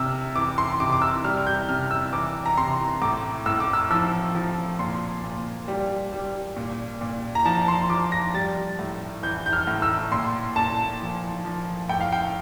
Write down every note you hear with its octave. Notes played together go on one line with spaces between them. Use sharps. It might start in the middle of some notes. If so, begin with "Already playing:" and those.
Already playing: C3 E6 F6
E3 D6
C6
C3 D6
D6
E6
G3 F6
G6
C3 F6
E6
E3 D6
A#5
C3 C6
A2 D6
A2 E6
D6
E6
F3 E6
F3
A#2 C6
A#2
G3
G3
A#2
A#2
A#5
F3 A5
C6
F3 D6
A#6
G3 A6
A2
E3 G6
G6
F6
A2
E6
A#2 C6
A#2 A5
F3
F3
A2 G5
F5
G5